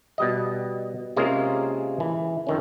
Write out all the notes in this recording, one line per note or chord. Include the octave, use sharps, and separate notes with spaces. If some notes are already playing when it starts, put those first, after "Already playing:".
B2 G3 D#5
C3 G#3 A#3 C#4 F4 G#4
E3
F2 D#3 C#4